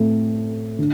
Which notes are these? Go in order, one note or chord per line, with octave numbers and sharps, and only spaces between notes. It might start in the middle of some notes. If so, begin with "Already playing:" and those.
Already playing: A2 A3 C4
D3